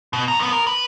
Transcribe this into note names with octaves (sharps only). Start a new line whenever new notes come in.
B2
C#3 A#5
F#2 B3
A#4
B4